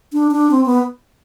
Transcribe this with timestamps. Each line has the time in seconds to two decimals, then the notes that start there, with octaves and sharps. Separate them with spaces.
0.13 D4
0.32 D4
0.51 C4
0.66 B3